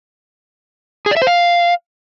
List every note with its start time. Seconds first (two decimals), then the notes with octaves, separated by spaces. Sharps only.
1.06 G#4
1.11 D5
1.17 E5
1.22 C5
1.27 F5